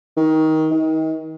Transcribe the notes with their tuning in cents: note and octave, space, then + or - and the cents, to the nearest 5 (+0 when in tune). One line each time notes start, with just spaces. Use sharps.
D#3 +20
D#3 +35